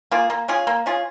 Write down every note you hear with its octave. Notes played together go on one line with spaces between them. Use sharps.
A#3 F4 G#4
A#3
C#4 F4 G#4
A#3
C#4 F4 G#4